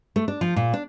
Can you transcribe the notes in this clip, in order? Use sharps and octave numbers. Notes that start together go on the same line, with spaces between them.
A3
D4
F3
A#2
D4